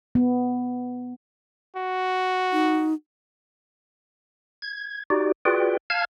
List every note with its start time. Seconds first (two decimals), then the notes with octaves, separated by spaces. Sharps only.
0.15 B3
1.77 F#4
2.52 D#4
4.62 G#6
5.10 D#4 F#4 G4 D5
5.45 F4 F#4 G#4 B4 D5 G5
5.90 F5 A5 F6 G#6